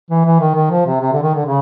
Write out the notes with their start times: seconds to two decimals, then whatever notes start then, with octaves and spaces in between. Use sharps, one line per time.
0.10 E3
0.26 E3
0.40 D#3
0.55 D#3
0.71 F3
0.86 C3
1.01 C3
1.13 D3
1.23 D#3
1.35 D3
1.46 C#3